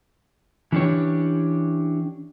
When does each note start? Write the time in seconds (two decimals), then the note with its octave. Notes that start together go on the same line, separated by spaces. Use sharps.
0.72 E3 C#4 D4 G4 C#5